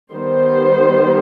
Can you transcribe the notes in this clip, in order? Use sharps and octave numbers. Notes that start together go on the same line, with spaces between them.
D#3 G3 B3 C5